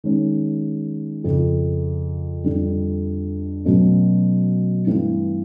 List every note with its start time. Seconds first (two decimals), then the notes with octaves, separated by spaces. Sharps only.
0.04 D#3 G#3 C#4
1.24 F2 C#3 F3
2.44 F2 D3 G3
3.65 B2 F#3 A3 C#4
4.87 G2 E3 A3 C4